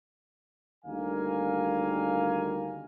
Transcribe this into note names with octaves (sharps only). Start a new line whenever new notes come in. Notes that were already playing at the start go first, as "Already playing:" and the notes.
D2 D#3 G3 A#3 F5 G#5